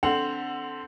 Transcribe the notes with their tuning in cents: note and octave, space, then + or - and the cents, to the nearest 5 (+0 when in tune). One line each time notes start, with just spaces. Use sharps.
D3 -5 C4 -5 F#5 +0